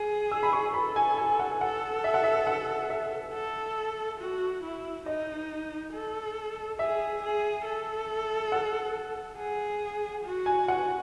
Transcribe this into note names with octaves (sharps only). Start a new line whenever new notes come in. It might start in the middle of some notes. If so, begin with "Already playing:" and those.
Already playing: G#4
E6
B5
C#6
A4 B5
G#5
G#5
F#5
A4 F#5
E5
F#5
E5
F#5
E5
A4
F#4
E4
D#4 D#5
A4
G#4 E5
G#4
A4
F#5
G#4
F#4
G#5
F#4 F#5